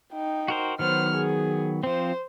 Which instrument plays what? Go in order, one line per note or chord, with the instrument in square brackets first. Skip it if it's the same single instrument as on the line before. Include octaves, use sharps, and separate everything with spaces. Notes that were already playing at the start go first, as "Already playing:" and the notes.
[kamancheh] D#4 G5
[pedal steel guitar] F#4 A#4 C5
[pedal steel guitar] D#3 F#3 B3 [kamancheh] C5 F6
[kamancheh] G#4
[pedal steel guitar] F3 C4 [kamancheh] C5